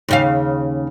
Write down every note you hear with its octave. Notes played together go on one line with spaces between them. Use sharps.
D#2 C#3 F5